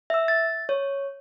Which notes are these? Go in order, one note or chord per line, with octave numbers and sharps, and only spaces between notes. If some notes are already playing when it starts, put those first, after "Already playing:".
E5 E6
A6
C#5